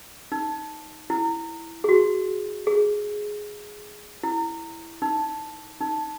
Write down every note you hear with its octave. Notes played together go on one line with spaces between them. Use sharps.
D#4
E4
G#4
F#4
G#4
E4
D#4
D#4